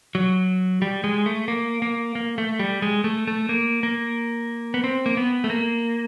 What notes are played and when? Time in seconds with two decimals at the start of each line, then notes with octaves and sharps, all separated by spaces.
0.15 F#3
0.82 G3
1.04 G#3
1.26 A3
1.48 A#3
1.82 A#3
2.15 A#3
2.38 A3
2.59 G3
2.82 G#3
3.04 A3
3.27 A3
3.49 A#3
3.83 A#3
4.74 B3
4.84 C4
5.06 A#3
5.17 B3
5.44 A3
5.50 A#3